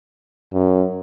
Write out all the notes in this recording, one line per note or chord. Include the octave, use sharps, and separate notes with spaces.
F#2